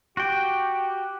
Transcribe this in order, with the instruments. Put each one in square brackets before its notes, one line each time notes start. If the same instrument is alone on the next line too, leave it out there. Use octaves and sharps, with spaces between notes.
[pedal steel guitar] F#4 G5 [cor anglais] G4